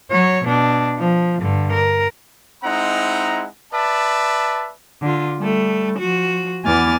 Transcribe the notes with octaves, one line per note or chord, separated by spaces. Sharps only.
F#3 C#5
B2 D4
F3
G2 D3
A#4
G#3 C4 D#4 E4 F#5 A#5
B4 D5 E5 A5
D3 F4
G3 A3
F3 F#4
E2 B3 G#5 D6 F6 A6